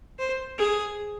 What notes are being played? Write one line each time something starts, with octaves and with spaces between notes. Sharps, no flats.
C5
G#4